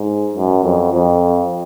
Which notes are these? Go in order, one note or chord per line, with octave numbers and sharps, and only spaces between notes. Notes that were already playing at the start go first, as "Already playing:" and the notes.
Already playing: G#2
F#2
F2
F2